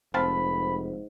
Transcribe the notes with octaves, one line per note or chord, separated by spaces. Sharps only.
F1 G#2 C4 F5 A5 B5